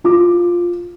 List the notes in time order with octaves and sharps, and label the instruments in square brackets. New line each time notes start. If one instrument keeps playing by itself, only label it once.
[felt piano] F4 D6